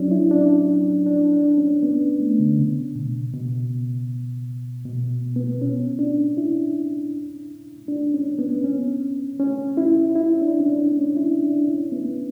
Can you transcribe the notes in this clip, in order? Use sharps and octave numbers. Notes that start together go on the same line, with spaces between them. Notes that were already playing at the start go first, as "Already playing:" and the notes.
Already playing: F#3 C#4 D4
E4
D4
D4
D4
C#4
B3
A3
D3
C#3
B2
B2
B2
B3
C#4
D4
E4
D4
C#4
B3
C#4
C#4
E4
E4
D4
C#4
D4
C#4
E4
D4
D4
C#4
B3